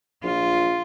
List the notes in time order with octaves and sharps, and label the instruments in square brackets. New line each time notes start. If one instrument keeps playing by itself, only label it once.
[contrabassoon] A#1 [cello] F4